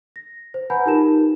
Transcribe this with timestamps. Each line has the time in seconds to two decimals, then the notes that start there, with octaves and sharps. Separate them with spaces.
0.16 A#6
0.54 C5
0.70 B4 F#5 G#5 A#5 B5 G6
0.86 D#4 F4 G4 A#4 A5 E7